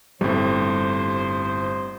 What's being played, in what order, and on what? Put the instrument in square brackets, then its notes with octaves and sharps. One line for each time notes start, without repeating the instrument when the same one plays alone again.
[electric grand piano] G1 A2 [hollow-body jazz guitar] G3 C4 [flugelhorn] C5